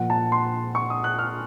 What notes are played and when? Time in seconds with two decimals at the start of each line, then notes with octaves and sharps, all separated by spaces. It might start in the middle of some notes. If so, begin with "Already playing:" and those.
Already playing: A#2 F3 F#5
0.10 A5
0.32 C6
0.75 C#6
0.90 D#6
1.04 F#6
1.19 F6